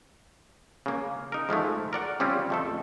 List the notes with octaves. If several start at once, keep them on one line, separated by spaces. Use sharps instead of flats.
C#3 A#3
D#4 A#4
G#2 F3 G#3 A3
A#4 D5 F#5
C#3 G3 C4 C#4 F4
F2 A3 A4